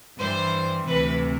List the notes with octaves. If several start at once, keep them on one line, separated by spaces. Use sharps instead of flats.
G2 E3 G3 C5
D2 C3 E3 B4